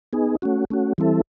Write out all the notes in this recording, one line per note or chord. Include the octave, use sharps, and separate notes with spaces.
B3 D#4 G#4
A3 C#4 F#4
A3 C#4 F#4
E3 G3 C4 E4 A4